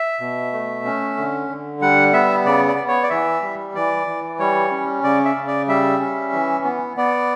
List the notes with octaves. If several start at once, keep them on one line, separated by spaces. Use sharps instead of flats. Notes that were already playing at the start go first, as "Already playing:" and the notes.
Already playing: E5
B2
A3
C#4
D3
D3
G3 F#5
B3 E5
C#3 D5
D5
B3
C#5
D5
E3 E5
G3
E3 D5
E3
G3 C#5
C#4
C#3 D5
E5
C#3
D5
G3 E5
C#4
E3
B3
B3 D5